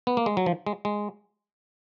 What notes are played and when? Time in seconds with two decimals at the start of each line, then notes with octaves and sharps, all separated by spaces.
0.07 B3
0.17 A#3
0.26 G#3
0.37 F#3
0.46 F3
0.67 G#3
0.85 G#3